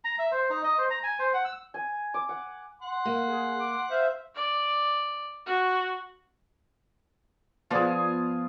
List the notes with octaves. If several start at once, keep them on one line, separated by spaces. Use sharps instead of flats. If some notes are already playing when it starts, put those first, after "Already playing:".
A#5
E5
C5
D#4
D#5
C5
A#5
G#5
C5
F#5
E6
G#5
D6
F#5
F#5 C6
A#3
G#4
D6
C5 E5 F5
D5
F#4
F3 B3 F4 G#4 D5